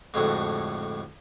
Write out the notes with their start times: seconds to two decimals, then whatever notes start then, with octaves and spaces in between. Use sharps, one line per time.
0.14 F2 A2 D3 G#3 F#4 A4